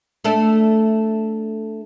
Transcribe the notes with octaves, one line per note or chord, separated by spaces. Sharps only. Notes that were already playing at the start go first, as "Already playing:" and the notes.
A3 D4 A4